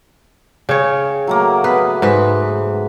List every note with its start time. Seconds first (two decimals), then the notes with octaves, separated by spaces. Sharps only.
0.69 C#3 C#5 G5
1.27 F#3 A3 A#3
1.64 B3 B4
2.02 G#2 B4